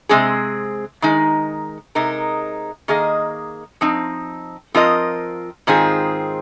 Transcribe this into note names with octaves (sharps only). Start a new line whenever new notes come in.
C3 G#3 C4 G#4
D#3 G#3 D#4
C3 G#3 D#4 A#4
D#3 A#3 G#4 D#5
F3 C4 D#4
F3 C4 F4 A#4 D#5
G#2 D#3 C4 F4 G#4